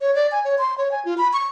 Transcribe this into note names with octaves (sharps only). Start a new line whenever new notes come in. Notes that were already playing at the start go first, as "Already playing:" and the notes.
C#5
D5
G#5
C#5
C6
C#5
G#5
F4
B5
C#6